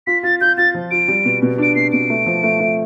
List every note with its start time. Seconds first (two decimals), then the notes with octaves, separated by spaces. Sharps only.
0.07 F4 B6
0.23 F4 A6
0.41 F4 G6
0.57 F4 A6
0.74 F3
0.91 F4 D7
1.08 G3
1.25 B2
1.42 B2
1.58 D4 D7
1.75 B2 C7
1.92 B2 D7
2.10 A3
2.26 F3
2.43 A3
2.60 A3